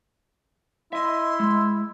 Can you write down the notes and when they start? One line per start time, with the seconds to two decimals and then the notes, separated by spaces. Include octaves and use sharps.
0.93 E4 D#5 E5 C6
1.40 G#3